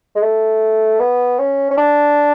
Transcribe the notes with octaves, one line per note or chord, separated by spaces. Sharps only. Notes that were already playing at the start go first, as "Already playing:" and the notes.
G#3
A3
B3
C#4
C#4
D4